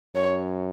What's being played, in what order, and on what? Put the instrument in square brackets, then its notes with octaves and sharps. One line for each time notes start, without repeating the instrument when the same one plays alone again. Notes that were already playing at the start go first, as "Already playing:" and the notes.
[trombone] F#2 [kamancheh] C#5